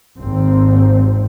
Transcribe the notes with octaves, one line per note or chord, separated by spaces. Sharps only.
G#1 D#2 C4